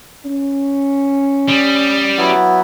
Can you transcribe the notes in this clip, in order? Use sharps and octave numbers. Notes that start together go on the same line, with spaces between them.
C#4
G3 D#6
F#3 B3 E4